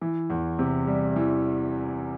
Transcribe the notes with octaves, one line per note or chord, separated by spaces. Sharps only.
E3
E2
C3
G3
E3